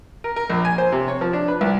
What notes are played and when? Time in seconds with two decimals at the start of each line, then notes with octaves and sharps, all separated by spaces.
0.24 A#4
0.36 A#4
0.50 A#1
0.65 G#5
0.78 C5
0.92 C3
1.08 C#5
1.21 F3
1.33 D4
1.48 B4
1.61 C2